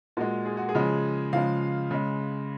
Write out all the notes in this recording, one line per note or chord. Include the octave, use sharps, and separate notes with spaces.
A#2 G#3 F#4
G#4
F#4
G#4
C#3 F3 G#3
C#3 F3 G#3 F5
C#3 G#3